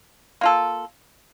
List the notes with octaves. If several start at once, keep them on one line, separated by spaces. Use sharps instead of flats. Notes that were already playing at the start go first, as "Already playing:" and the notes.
A#3 F4 A4